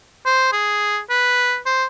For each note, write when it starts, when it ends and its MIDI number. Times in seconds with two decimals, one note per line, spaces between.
0.26 0.50 72
0.53 0.99 68
1.10 1.58 71
1.66 1.86 72